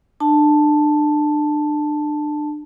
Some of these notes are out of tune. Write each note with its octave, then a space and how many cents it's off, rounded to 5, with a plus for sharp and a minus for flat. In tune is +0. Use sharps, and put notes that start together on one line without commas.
D4 +30 A5 +0